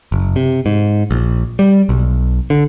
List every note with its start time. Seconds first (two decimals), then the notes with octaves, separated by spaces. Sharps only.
0.12 F#1
0.36 C3
0.66 G#2
1.11 A#1
1.59 G3
1.89 B1
2.50 D3